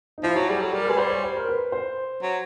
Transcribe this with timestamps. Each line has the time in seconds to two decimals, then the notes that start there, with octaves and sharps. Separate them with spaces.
0.18 D#4
0.23 F3 E4
0.36 F#3 F#4
0.49 G3 G#4
0.61 F#3 A4
0.73 G3 A#4
0.86 G#3 B4
0.98 G3 C5
1.11 C#5
1.23 C5
1.36 A#4
1.49 B4
1.72 C5
2.22 F#3